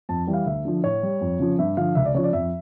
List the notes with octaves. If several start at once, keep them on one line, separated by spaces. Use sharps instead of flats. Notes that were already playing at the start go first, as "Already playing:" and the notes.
F2 A5
E3 G3
F5
D2 E5
D3 F3
A2 C#5
G3
F2
C#3 F3
G2 E5
D3 F3 F5
C#2 E5
D5
C#3 F3 C#5
D5
F2 E5